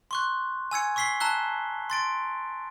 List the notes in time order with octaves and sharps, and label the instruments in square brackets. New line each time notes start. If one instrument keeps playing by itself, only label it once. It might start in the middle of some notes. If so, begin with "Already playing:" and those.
[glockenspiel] C6 C#6 F#6
G#5 E6 G#6 C#7
C#6 E6 B6 C7 G7
A5 A#5 E6 F#6 G7
C6 A6 D7